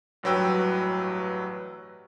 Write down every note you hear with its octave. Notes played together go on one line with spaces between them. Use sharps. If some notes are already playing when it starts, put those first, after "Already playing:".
A1 G2 F#3 B4 G5 E6